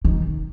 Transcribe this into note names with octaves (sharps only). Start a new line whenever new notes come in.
D#3